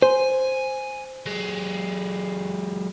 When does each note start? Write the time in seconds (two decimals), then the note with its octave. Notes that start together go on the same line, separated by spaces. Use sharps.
0.02 C5 G#5
1.26 F#3 G#3